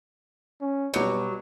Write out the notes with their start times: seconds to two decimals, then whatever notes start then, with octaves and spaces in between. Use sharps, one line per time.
0.61 C#4
0.94 B2 F#3 G3 D6 C#7